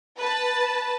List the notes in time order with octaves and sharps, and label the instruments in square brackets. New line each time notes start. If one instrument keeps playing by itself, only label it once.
[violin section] B4 A5